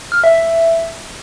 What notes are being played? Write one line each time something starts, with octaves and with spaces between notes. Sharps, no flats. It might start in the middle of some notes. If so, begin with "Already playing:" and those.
F6
E5
E5